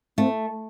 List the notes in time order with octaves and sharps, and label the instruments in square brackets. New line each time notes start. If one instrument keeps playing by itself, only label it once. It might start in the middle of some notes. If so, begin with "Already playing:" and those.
[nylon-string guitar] A3 [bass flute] C4